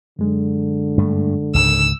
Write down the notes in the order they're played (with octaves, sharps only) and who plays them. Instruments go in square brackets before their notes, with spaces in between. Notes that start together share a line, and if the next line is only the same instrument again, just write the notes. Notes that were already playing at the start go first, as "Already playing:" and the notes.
[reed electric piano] F#2 G#3 [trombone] D3
[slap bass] G2 A3
[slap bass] C#2 G#2 C#3 [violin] E6